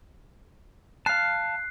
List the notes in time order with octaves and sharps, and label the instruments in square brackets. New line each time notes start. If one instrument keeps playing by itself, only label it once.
[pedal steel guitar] F5 A5 [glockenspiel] F#6 C7